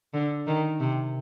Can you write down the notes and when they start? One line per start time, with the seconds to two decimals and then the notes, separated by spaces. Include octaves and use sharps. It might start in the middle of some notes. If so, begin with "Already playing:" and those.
0.14 D3
0.47 D#3
0.80 C3